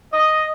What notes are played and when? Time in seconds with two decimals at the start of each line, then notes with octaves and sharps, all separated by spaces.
0.12 D#5